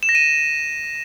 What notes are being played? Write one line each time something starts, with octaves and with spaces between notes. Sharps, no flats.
E7
A#6
D#7